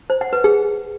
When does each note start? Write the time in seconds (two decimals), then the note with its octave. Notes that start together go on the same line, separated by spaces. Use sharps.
0.10 C5
0.21 F#5
0.33 B4
0.44 G#4